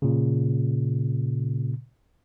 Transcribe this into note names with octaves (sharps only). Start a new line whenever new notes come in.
A#2 C#3